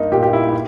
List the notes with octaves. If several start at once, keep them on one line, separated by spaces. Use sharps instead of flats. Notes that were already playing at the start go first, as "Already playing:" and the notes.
Already playing: G2 A#3 D#4
A#2 G4
G4
E4
E4